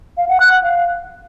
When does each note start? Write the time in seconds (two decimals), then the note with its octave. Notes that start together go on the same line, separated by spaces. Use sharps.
0.17 F5
0.29 F#5
0.40 F#6
0.52 F#5
0.63 F5